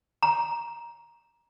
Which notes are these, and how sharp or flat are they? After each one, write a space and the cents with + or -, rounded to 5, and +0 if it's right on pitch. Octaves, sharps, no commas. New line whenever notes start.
A#5 +10